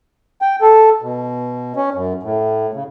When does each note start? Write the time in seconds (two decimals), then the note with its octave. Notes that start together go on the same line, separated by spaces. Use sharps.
0.42 G5
0.62 A4
1.02 B2
1.76 C#4
1.94 F#2
2.23 A2
2.74 C#3